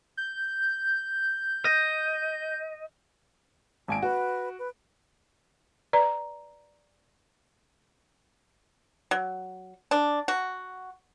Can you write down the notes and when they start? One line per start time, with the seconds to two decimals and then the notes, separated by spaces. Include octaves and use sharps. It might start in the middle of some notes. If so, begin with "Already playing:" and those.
0.17 G6
1.65 D#5
3.88 G#1 G#5 A5 D7
4.02 F#4 B4
4.59 B4
5.93 B4 D5 A#5
9.11 F#3
9.91 D4
10.28 F#4